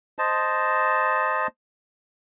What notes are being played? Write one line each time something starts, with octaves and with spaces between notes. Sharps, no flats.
C5 D#5 A5